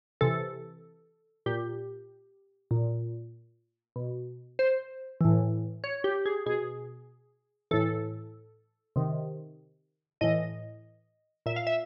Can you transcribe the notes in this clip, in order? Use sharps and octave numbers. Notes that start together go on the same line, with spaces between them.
C3 E3 A4
A#2 G4
A#2
B2
C5
A2 E3
C#5
G4
G#4
B2 G#4
A2 E3 A4
C3 D#3
A2 E3 D#5
A#2 E5
F5
E5